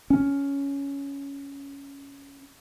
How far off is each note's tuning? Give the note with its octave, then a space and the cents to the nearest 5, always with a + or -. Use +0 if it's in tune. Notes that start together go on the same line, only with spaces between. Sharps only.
C#4 +10